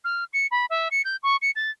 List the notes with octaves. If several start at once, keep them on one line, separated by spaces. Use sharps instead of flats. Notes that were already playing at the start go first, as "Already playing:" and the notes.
F6
C#7
B5
E5
C#7
G6
C#6
C#7
A6